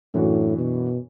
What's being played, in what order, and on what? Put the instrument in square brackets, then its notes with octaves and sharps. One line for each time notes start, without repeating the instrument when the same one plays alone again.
[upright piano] F#2 E3 D4 F#4 [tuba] A2
[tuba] B2